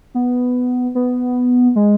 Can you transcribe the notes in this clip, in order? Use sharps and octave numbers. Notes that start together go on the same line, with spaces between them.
B3
B3
G#3